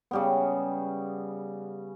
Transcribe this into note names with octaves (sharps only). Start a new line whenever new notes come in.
C#3 G3 B3